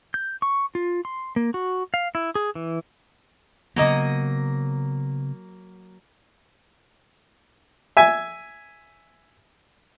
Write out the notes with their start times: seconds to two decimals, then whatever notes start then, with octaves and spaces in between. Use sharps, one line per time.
0.14 G6
0.42 C#6
0.75 F4
1.05 C6
1.36 A#3
1.54 F#4
1.94 F5
2.15 E4
2.35 G#4
2.55 E3
3.76 C#3 F#3 A#3 B3 D#5
7.97 E5 G#5